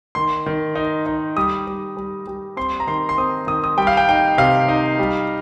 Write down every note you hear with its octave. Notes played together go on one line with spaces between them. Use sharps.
D#3 C6
D#3
D#4
D#4
G3 D#6
G3
G3
G3
C4 C6
A#5
D#3 C6
C6
C4 D#6
D#3 D#6
D#6
G3 G5
F5
G5
D#4 G5
C3 F5
D#4
G3